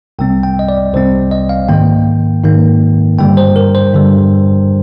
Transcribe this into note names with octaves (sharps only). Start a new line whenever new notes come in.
C2 C3 G3 C4 G5
G5
D#5
D5
C2 C3 G3 C4 C5
D#5
F5
G#2 D#3 A#3 G5
G#2 D#3 A#3
G2 D3 G3 G5
C5
A#4
C5
G2 D3 G3